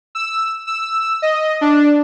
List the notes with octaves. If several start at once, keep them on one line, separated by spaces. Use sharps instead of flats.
E6
E6
D#5
D4